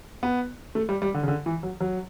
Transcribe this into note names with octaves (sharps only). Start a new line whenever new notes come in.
B3
A3
G3
G3
D3
C#3
D3
E3
F#3
F#3